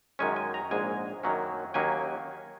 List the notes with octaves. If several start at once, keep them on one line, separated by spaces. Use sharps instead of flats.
F#2 D#3 G#3 C#4 G#5
G#5
A#5
A#1 G#2 G#3 G#5
F#2 D#3 F#3 A#3 C#4
D#2 D#3 F#3 A#3 C#4 G#5